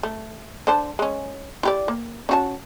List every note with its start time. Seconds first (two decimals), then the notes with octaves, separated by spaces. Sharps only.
0.03 A3
0.67 D3 C5 A5
0.99 G#3 C#4
1.63 E4 G4 D5
1.88 A#3
2.29 C#4 F#4 A5